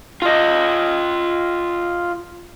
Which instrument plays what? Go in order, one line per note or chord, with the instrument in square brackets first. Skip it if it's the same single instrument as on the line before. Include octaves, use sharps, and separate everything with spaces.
[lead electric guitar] F4 D#5